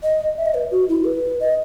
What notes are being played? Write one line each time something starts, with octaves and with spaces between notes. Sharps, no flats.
D#5
E5
D#5
B4
F#4
E4
B4
D#5